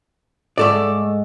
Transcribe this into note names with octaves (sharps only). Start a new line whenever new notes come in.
G#2 G#3 A3 A4 D5